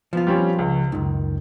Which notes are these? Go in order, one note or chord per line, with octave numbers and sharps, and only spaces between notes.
F3 B3 F4
G3 C4 C#4
C#2
C#2 F#2 D#3